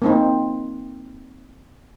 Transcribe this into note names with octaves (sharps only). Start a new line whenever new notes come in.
A#3 C4 D#4